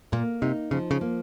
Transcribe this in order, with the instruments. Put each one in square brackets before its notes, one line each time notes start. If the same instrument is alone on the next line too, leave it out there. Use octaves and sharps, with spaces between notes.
[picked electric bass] A#2 [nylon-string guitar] A#3
[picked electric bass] C3 [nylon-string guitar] D#4
[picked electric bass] C#3 [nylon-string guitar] F3
[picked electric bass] C#3
[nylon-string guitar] A#3